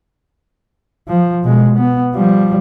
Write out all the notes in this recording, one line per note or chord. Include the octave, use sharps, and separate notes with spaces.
F3
B2 G#3
B3
F3 G3